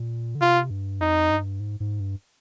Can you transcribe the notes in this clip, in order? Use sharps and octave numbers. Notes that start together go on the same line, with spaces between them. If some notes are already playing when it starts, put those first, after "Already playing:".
Already playing: A#2
D3
C3 F4
G2
F2 D#4
G2
G#2
G#2
G2